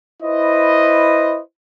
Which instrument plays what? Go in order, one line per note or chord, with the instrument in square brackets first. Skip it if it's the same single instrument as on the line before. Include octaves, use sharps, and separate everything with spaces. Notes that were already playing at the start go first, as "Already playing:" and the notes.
[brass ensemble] E4 B4 C5 D#5